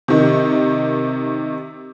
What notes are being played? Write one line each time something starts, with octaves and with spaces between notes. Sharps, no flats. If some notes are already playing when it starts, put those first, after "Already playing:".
C3 D#3